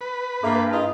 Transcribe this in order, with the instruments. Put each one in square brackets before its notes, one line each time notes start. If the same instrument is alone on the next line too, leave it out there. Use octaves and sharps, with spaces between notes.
[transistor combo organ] B4
[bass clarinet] G2 [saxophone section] A#3 [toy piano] G#4 E5
[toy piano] E4 A5 [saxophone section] F4 G#4 D#5